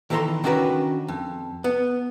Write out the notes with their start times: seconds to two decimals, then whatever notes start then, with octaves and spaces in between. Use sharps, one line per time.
0.10 D#3 E3 A4 C#5 A#5 C6
0.44 D#3 C#4 D4 F#4 A#4 B4
1.08 F2
1.64 B3